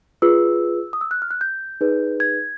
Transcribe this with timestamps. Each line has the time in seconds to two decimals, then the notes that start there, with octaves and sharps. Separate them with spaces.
0.22 F4 G#4 B4 E6
0.93 D#6
1.01 E6
1.11 F#6
1.22 F6
1.31 F#6
1.41 G6
1.81 D#4 G#4 B4 D5
2.20 G#6